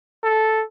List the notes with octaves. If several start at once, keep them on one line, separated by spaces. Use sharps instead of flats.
A4